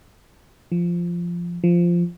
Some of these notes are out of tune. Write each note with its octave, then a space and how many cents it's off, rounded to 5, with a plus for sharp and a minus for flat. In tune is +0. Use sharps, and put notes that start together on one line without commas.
F3 -10
F3 -10